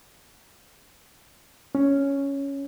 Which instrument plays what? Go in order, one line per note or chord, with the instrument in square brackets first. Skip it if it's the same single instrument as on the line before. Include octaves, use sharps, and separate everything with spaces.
[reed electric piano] C#4